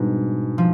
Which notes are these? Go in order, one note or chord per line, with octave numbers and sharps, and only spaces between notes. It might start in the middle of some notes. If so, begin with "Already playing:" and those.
Already playing: G#2 B2 G3 B3 D4
F3